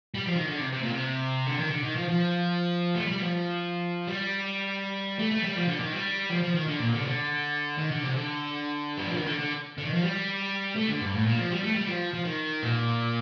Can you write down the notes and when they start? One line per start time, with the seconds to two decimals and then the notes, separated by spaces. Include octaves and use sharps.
0.14 G3
0.26 F3
0.36 D#3
0.47 D3
0.60 C3
0.73 C3
0.83 A#2
0.94 C3
1.47 D3
1.59 D#3
1.71 D3
1.84 D#3
1.96 F3
2.09 F3
2.95 A3
3.07 G3
3.20 F3
4.07 G3
5.19 A3
5.31 A3
5.43 G3
5.55 F3
5.68 D3
5.80 D#3
5.92 G3
6.30 F3
6.43 F3
6.55 D#3
6.67 D3
6.79 A#2
6.92 D3
7.00 C3
7.04 D3
7.78 D#3
7.91 D3
8.04 C3
8.16 D3
8.98 G3
9.06 F3
9.17 D#3
9.27 D3
9.39 D3
9.78 D3
9.85 D#3
9.94 F3
10.02 G3
10.76 A3
10.88 D3
11.01 G2
11.14 A2
11.26 A#2
11.37 F3
11.51 G3
11.63 A3
11.76 G3
11.87 F3
12.14 F3
12.25 D#3
12.62 A#2